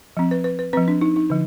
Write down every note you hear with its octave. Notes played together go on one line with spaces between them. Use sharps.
F3 C4
B4
B4
B4
F3 C4 B4
D4
D#4
D#4
D3 F3